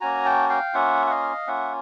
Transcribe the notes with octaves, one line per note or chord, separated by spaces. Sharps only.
A#3 C#4 F#4 G#5 A#5
G5 A5
F5 G5
A#3 C#4 F4 E5 F#5
F#5
D#5 F5
A#3 C#4 F4 E5 F#5